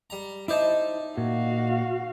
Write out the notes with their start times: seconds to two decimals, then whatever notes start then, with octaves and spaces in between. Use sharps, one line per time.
0.10 G3 A#5
0.48 D#4 E4 C5 D5 E5 A5
1.18 A#2 F#4 F5